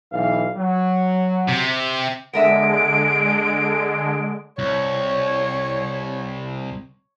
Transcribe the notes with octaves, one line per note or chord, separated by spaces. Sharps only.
B1 E3 F5
F#3
C3
D3 G#3 B3 A#4 E5 D7
C2 C#5